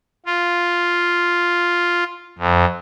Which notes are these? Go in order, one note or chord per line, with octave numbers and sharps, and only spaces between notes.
F4
F2